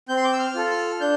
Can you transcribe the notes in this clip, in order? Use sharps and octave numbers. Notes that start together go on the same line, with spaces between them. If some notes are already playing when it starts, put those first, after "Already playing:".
C4 G6
C6
D6
E6
F6
F4 A4
F6
D4 G6